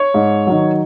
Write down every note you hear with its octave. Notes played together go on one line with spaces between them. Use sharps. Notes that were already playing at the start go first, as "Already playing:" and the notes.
Already playing: C#5
G#2
D#3 F#3